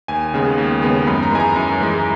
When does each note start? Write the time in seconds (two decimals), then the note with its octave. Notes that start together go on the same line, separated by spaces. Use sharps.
0.08 D#2 G#5
0.34 C#3 G#3 B3
0.58 D#2
0.82 C#3 G#3 B3
1.07 F#2 B5
1.23 A#5
1.32 E3 G#3 G#5
1.40 A#5
1.56 F#2
1.80 E3 G#3